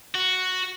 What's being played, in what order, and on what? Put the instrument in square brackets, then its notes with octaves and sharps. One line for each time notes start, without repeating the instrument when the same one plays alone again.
[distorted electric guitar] F#4